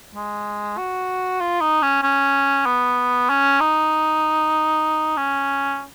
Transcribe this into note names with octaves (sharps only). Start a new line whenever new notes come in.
G#3
F#4
F4
D#4
C#4
C#4
B3
C#4
D#4
C#4